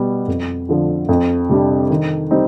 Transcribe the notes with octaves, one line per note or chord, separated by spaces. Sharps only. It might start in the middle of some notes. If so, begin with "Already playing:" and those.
Already playing: B2 G3 B3
F2
D3 F3
F2
C3 G3 D4
D#3
G3 C4 D#4